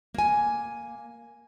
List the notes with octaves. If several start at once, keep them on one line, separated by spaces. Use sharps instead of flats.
A#3 G#5